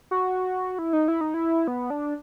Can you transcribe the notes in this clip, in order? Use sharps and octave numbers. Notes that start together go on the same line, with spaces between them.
F#4
E4
D#4
E4
D#4
E4
B3
D4